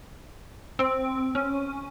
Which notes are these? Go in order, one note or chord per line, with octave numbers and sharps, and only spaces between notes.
C4
C#4